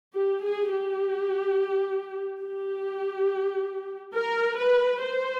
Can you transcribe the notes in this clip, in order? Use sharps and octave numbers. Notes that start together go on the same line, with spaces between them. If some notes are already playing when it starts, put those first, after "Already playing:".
G4
G#4
G4
G4
A#4
B4
C5